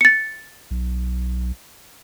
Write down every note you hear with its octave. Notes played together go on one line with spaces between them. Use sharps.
A6 C#7
B1